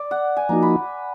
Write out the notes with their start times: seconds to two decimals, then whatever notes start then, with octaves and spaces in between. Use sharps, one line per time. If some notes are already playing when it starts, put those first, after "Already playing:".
Already playing: D5
0.11 F#5
0.37 G#5
0.49 F3 A#3 D#4 F#4 A#5
0.62 B5